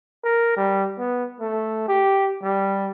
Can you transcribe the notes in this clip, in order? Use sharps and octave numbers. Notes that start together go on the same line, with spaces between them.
A#4
G3
B3
A3
G4
G3